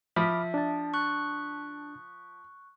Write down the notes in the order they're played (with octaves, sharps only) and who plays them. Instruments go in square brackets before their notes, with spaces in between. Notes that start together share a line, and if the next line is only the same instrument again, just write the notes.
[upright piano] F3 [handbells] E5 [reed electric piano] B5 D6 F6
[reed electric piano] D4 A5
[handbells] C#6 F#6